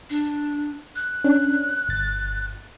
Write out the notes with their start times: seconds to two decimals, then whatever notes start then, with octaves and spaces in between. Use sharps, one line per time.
0.10 D4
0.96 F#6
1.24 C#4 D4
1.89 G1 A6